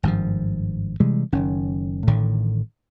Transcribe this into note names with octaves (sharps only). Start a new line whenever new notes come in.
G#1 G2 D#3 F3
C3 E3 G3 G#3
F#1 D#3 C#4
A1 A2 D3 D#3